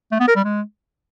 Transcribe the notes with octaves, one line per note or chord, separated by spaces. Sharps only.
A3
B3
A#4
G3
G#3